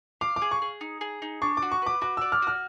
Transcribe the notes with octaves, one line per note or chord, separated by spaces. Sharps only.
F5 D6
D6
G#4
C#6
G#4
D#4
G#4
D#4
D4 C#6
D6
F#4
C#6
B4 D6
F#4 D6
D5 E6
F6
F#4 F6